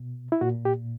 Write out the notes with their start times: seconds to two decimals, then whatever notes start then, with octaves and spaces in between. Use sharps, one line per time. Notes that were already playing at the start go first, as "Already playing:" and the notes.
Already playing: B2
0.32 E4
0.41 A#2 F#4
0.65 G4